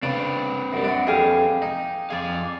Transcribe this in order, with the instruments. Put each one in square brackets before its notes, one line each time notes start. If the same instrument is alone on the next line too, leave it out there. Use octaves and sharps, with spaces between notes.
[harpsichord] C#3 D4 [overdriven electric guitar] C4 B4
[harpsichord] F#2 G3
[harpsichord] D4 [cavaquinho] F#4 E5
[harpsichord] F2 [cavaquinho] G4 G#4 F5
[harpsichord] D#4
[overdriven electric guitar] F2 F5 [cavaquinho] G#4 D5